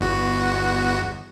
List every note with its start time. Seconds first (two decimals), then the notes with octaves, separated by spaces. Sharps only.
0.01 G1 E2 F#4